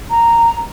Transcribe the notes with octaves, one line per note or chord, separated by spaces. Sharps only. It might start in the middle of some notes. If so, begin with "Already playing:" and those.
A#5